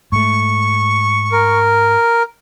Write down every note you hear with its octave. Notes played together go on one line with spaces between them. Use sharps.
G#2 A3 C#6
A#4